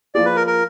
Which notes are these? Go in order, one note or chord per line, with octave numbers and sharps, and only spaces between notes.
F3 A#3 F4 G#4 D5
B4
A#4
A#4